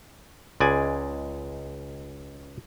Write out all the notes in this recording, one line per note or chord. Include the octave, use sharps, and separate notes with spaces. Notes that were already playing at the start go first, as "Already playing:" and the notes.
C#2 G#3 D5 G#5